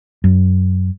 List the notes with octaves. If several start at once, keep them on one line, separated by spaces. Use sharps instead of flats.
F#2